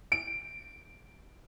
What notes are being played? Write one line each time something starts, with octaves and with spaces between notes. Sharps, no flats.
D7